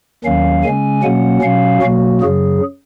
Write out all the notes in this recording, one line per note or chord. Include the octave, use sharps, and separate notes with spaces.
D#2 D#3 F#3 C#4 F5
C#3 G#3 C#4 G#5
B2 F#3 A#3 C#4 F#5
B2 F#3 C#4 F5
B2 F#3 A#3 F#4
F#2 C#3 F#3 G#4